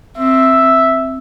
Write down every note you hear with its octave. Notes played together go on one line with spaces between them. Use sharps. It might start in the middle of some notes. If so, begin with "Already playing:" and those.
C4 E5